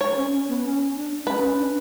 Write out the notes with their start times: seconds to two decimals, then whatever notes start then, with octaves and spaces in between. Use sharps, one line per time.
0.01 C#5
0.16 C#4
0.32 C#4
0.48 B3
0.64 C#4
0.95 D4
1.26 C#4 B4
1.43 C#4
1.58 D4